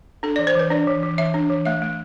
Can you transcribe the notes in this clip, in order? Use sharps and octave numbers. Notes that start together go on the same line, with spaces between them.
D4 A4
E3 D5
C5
E3 B4
D4 D5
E3
E3
E3 E5
D4
E3
A3 E5
A3